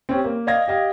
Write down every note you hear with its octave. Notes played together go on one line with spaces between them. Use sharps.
C4 C#4 G4
A#3
D5 D#5 F5 G#6 A#6
G4 D#5 F5